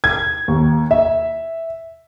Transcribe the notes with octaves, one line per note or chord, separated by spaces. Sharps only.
G#6
D#2
E5